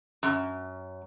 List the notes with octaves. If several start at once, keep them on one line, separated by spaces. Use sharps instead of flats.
F#2